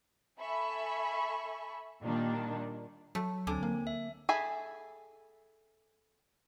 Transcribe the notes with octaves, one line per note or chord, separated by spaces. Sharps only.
A4 E5 G#5 B5 C#6
A#2 D#3 G3 A#3 D4 D#4
F#3 A3
D2 D3 C4 G#5
A#3
E5
G#4 A4 E5 G#5 B5